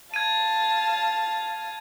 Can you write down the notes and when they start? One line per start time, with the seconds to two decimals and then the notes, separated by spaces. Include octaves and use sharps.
0.14 F5 A5 G#6 D#7